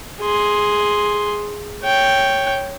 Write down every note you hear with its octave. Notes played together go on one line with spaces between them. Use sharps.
G#4 C6
C#5 G5